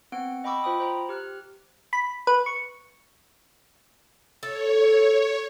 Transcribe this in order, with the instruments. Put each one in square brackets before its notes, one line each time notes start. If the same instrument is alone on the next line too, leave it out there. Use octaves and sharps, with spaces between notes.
[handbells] B3 C4 F#5 D7
D#5 G5 B5 C#6 D6 E6
F4 C5 G5 B5 D#6
C5 A#5
G4 F6 F#6
[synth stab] B5
B4
C#6
[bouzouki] A4 [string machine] C#5